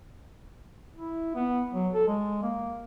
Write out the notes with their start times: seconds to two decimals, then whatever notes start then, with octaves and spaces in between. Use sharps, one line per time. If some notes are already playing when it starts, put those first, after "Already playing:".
0.97 E4
1.36 B3
1.73 F#3
1.94 A4
2.08 G#3
2.43 A#3